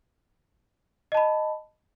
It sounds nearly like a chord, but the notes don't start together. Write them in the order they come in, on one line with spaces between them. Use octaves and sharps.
D#5 A5 B5